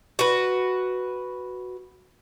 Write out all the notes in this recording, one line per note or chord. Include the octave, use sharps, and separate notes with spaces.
F#4 B4